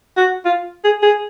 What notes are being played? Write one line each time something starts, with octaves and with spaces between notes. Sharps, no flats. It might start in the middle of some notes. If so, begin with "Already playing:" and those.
F#4
F4
G#4
G#4